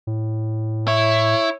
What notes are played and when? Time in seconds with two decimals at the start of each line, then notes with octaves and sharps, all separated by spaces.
0.07 A2
0.88 E4 C#5